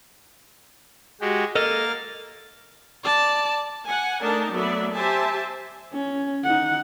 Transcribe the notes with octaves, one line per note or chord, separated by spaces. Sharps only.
G#3 F#4 G4
A#3 A4 A#4 D#5 F6 A6
D5 A5
F#5 G#5
A3 D4 D#4 A#4 A5
F#3 A3 B3 D5 E5
G4 C5 E5 G#5 A5
C#4
D#4 F#5